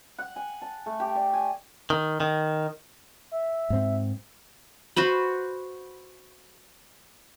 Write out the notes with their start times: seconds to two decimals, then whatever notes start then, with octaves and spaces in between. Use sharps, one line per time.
0.18 F#5
0.36 G#5
0.62 A5
0.86 A3
1.00 G4
1.15 D5
1.33 G#5
1.90 D#3
2.20 D#3
3.31 E5
3.70 G#2 C4
4.96 F#4 B4 C5 B5